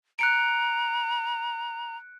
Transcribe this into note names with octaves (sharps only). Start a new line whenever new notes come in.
A#5 F#6 C#7 D7